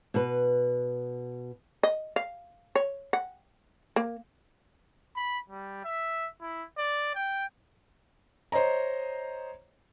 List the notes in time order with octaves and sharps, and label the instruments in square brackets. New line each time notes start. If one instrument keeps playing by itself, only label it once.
[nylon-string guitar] B2 B4
[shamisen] D#5
F5
C#5
F#5
A#3
[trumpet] B5
G3
E5
E4
D5
G5
[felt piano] C5 C#5 D#5 A#5